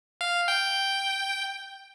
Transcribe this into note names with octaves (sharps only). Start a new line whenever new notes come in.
F5
G5